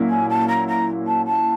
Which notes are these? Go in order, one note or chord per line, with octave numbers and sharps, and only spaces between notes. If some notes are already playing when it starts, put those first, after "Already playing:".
Already playing: A#2 F#3 A#3 C#4 E4
G#5
A5
A#5
A#5
A5
A5